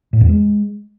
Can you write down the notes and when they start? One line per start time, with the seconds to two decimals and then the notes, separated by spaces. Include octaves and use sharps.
0.13 A2
0.21 E2
0.29 G#3